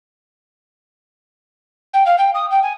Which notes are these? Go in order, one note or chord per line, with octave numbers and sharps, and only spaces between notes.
G5
F5
G5
D#6
G5
G#5